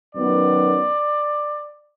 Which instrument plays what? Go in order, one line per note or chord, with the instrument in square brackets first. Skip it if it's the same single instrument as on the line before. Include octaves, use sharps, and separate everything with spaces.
[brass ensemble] F#2 D#3 F#3 B3 D5